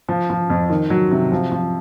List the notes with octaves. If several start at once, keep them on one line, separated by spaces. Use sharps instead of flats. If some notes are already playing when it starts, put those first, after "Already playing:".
F3
F3
F2
D#3
F#3
C3
F3
F3